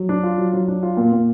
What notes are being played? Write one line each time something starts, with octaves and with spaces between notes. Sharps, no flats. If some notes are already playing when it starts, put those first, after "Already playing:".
Already playing: F#3
D4
F4
F#3
F#3
D4
F4
A#2
A#2